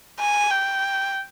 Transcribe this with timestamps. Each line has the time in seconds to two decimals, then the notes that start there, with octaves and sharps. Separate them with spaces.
0.20 G#5
0.50 G5